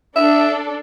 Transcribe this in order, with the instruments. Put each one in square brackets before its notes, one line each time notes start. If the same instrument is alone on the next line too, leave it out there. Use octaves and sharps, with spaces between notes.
[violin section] D4 A4 [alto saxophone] E5